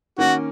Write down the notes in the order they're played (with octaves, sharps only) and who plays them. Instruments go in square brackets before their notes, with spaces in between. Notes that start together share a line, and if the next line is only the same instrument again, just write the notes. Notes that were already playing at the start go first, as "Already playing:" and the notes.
[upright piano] D#3 A#3 C#4 [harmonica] F#4